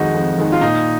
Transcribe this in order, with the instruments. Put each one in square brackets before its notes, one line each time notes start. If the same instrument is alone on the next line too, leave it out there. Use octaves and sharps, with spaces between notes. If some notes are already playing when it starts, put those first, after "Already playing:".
Already playing: [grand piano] F2 D#3 G#3 D#4 [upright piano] F#4
[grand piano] F2
D#3 G#3 D#4
[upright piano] F4
[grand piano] A#2 [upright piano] D#4